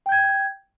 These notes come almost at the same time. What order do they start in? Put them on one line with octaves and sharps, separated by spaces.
G5 G6 G#6